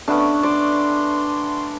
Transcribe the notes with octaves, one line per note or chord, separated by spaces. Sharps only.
A3 B3 C#4 D4
D5 C6